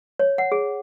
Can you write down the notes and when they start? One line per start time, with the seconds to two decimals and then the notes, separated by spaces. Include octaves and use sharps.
0.19 C#5
0.38 F#5
0.52 G#4